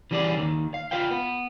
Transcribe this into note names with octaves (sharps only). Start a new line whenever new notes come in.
E3 G3 C#4 G#4 D5
D#2 D#3
F5
F4 B4 F5 G5
B3